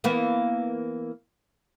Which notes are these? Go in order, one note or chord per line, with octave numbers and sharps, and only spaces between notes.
E3 A#3 B3